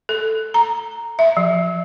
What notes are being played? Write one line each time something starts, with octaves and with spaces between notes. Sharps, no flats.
A4
A#5
E5
F3